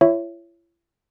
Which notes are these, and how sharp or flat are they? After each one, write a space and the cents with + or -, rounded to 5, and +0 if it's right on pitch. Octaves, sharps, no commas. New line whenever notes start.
E4 +45 C#5 +0 E5 +15